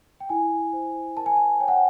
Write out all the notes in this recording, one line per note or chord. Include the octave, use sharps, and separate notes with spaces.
G5
E4 G#5
C5
A#4 A5
G#5
A5
C#5 G5
F#5